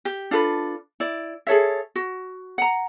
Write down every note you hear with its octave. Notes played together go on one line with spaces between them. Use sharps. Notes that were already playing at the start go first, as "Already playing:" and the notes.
G4
D4 F4 A4 B4
E4 D5
G#4 A4 C#5 E5
F#4
F#5 A#5